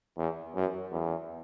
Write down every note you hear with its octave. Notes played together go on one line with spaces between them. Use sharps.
E2
F#2
E2